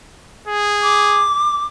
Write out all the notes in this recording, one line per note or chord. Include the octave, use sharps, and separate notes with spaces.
G#4
D6